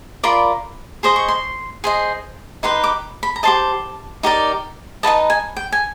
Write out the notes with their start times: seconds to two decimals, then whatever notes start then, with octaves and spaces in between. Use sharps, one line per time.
0.23 F4 A#4 D5 B5
1.03 G#4 C5 D#5 C6
1.16 C#6
1.28 C6
1.84 G#4 C5 D#5
2.63 D#4 G4 B4 C6
2.84 D6
3.23 B5
3.36 A#5
3.43 G4 C5 D#5 A5
4.23 D#4 G4 A#4 D5
5.03 D#4 F#4 B4 D#5 A5
5.30 G#5
5.57 G5
5.72 G#5